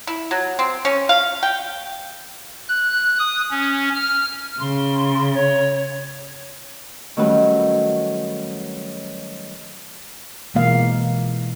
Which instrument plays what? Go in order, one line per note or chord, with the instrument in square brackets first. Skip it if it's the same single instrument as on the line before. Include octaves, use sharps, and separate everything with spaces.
[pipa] E4
F#3
C4
C#4
F5
G5
[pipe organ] F#6
D#6
C#4
F6
[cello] C#3 [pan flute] C6
[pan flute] C#5
[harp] D#3 F#3 G3 A3 C#4 B4
[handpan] B2 E3 G#3 A#3 F5